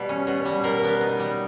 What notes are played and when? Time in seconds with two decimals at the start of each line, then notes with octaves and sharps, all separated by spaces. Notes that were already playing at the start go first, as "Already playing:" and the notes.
Already playing: B2 G3
0.09 C#4
0.27 B2
0.45 G3
0.64 B2 A#4
0.83 B3
1.01 D#4
1.19 G3